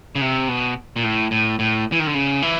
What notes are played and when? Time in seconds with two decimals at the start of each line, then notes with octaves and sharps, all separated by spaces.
0.15 C#3
0.21 C3
0.49 B2
0.96 A#2
1.04 A2
1.31 A2
1.59 A2
1.92 E3
2.00 D#3
2.07 D3
2.15 C#3
2.42 E3